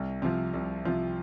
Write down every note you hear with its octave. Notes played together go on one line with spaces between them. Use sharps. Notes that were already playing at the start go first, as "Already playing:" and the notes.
Already playing: C2
C3 F3
C2
C3 F3